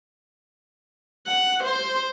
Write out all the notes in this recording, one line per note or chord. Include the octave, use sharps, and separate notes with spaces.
F#5
C5